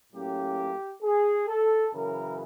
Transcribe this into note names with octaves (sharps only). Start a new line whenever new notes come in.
A2 F#3 A#3 C#4 G4
G#4
A4
F#2 C#3 E3 A#4